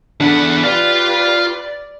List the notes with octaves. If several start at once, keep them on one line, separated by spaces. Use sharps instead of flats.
E2 D4 A4 F#5 B5
F4 G4 B4 D5 F5